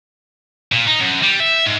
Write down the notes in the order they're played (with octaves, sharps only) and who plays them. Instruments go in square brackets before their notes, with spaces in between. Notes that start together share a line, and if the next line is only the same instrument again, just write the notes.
[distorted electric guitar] A#2
D#4
F#2
G3
E5
G#2